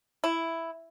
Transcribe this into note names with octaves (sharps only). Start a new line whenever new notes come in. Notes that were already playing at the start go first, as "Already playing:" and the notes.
E4